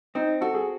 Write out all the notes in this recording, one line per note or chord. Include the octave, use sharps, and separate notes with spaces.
C4 D#4
F#4 A4
G#4